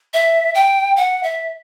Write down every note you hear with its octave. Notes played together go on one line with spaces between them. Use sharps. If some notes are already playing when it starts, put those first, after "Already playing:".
E5
G5
F#5
E5